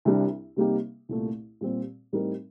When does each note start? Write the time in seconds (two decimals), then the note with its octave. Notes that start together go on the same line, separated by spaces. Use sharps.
0.05 C2 C3 G3 D4
0.57 C3 G3 A#3 D#4 G4
1.09 C2 A#2 A3
1.61 A#2 G3 C4 G4
2.12 A2 G3 C4 D#4 A#4